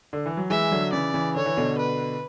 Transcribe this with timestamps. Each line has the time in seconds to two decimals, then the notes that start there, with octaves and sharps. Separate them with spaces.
0.13 D3
0.26 E3
0.37 F#3
0.50 E3 G#3 E5
0.71 D3 F#3
0.92 C#3 E3 D5
1.14 C#3 E3
1.35 D3 C#5
1.46 E3
1.57 B2 D3
1.78 B4